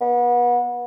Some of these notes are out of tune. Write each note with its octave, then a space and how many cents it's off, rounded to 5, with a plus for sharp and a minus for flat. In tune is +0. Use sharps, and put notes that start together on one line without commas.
B3 -30